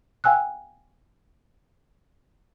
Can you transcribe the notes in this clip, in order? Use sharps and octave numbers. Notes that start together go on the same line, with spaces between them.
F5 G5 G#5 E6 F#6